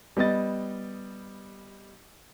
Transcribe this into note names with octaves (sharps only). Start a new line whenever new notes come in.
G3 B3 D#5 A6